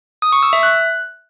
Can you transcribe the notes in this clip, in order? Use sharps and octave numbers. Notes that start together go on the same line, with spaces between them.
D#6
C#6
E6
E5
F#6